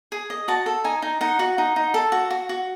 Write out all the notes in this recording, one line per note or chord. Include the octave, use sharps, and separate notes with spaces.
G#4
D#5
F#4 A5
A4
D#4 G#5
D#4
D#4 F#5
F#4
D#4
D#4
A4
F#4
F#4
F#4